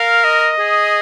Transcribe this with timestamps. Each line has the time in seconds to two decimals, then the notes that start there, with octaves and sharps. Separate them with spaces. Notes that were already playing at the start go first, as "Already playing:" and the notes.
Already playing: A#4 F5
0.24 D#5
0.59 G#4